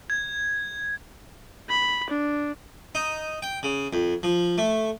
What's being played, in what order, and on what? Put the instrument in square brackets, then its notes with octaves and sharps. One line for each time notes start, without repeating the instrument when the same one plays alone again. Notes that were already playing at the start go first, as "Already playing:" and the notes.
[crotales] G#6
[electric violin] B5
D4
[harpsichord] D#4
G5
C#3
F2
F3
A3